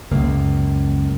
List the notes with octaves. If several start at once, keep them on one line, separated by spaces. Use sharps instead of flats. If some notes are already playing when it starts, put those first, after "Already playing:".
C#2 F#2 C#3 A#3